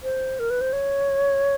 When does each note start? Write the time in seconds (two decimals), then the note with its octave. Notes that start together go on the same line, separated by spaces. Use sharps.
0.03 C5
0.39 A#4
0.50 B4
0.61 C5
0.73 C#5